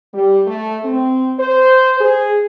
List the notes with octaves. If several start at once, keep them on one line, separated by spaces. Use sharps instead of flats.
G3
A3
C4
C5
G#4